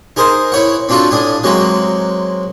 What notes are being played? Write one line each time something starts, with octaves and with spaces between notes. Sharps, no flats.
D#4 G#4 A#4 C5
E4 C#5 F#5
C4 D4 F4 F#4 A4
A2 D4 G#5 D#6
F#3 G#3 A#3 C4 F#4